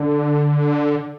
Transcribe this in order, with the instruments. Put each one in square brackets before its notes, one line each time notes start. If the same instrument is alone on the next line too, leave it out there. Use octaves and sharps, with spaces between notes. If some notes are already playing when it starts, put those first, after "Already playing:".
Already playing: [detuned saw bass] D3